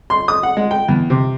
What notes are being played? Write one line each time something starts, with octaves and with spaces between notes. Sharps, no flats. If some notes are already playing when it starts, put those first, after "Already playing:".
C6
D#6
F#5
G#3
G5
E2
C3